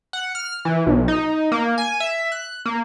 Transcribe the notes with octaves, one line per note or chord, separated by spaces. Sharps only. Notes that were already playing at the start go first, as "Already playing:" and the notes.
F#5
F6
E3
B1
D#4
A#3
G#5
E5
F#6
A#3